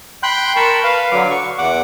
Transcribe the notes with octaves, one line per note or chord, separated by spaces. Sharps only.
G5 B5 C6 F#6 G6
A#4 A5 B5 C#6
B4 F5
D3 F#3 D6
C#6
E2 F#5 D6